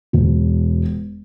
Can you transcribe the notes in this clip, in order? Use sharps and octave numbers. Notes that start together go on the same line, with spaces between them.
E1